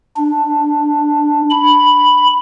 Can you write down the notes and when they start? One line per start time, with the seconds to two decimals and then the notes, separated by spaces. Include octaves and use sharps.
0.17 D4
1.51 B5